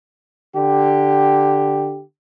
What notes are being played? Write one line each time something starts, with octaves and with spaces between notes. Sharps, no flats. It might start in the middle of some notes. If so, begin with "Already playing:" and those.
D3 G4